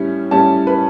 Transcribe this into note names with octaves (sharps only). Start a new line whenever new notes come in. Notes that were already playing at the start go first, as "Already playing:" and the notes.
Already playing: A2 G3 C#4 E4
A2 G3 C#4 E4 A5
B4